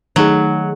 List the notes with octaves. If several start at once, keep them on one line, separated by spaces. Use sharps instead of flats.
D#3 F#3 A3 D#4 G#4